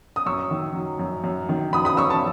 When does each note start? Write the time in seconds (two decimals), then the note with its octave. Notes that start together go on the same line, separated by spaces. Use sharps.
0.16 D#6
0.26 F#2 C#6 E6
0.51 D#3
0.75 F#3
0.99 F#2
1.24 F#2
1.49 D#3
1.73 F#3 B5 D#6
1.85 B5 D#6
1.97 F#2 C#6 E6
2.10 A5 C#6